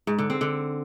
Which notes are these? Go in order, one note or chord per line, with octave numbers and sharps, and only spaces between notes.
G#2
D3
C4
D3